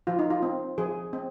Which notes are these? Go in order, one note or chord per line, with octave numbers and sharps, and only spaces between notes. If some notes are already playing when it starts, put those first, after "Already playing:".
F3 F4
D#4
F4
C4
F3 G#4
C4